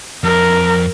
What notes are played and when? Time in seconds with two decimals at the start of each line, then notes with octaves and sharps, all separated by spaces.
0.24 F2 A#4